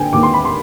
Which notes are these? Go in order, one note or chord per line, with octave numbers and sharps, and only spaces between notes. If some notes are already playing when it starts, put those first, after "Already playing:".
Already playing: D3 G5 G#5
D#2 D6
C6
B5
C6